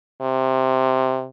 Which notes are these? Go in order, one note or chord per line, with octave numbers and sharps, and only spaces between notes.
C3